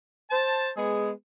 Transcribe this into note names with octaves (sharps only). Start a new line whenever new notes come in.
C5 A5
G#3 B3 G#4